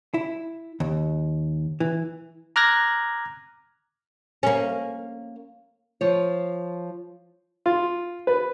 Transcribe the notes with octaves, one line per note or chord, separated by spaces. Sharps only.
E4
D#2
E3
A#5 D6 F6 F#6 G#6 A#6
A#3 C#4
F3 C#5
F4
B4